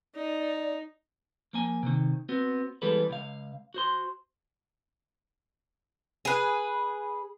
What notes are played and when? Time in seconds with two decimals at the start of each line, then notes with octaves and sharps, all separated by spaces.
0.15 D#4 D5
1.53 F3 A#3 G#5
1.83 C3 D#3
2.29 B3 C4 F#4
2.82 E3 G3 G#3 B3 A4 B4
3.10 C#2 F5
3.74 F#4 C5 C6
6.25 G#4 B4